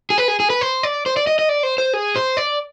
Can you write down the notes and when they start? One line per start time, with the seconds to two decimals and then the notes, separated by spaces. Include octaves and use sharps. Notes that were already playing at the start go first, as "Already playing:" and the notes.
0.10 G#4
0.18 B4
0.28 G#4
0.40 G#4
0.50 B4
0.61 C5
0.83 D5
1.06 C5
1.17 D5
1.27 D#5
1.39 D#5
1.49 D5
1.63 C5
1.78 C5
1.94 G#4
2.16 C5
2.37 D5